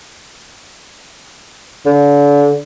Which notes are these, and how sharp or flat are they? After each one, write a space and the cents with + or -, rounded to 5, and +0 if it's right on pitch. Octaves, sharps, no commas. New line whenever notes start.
D3 -35